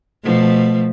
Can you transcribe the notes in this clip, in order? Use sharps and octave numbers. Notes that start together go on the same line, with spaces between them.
B2 F3 A3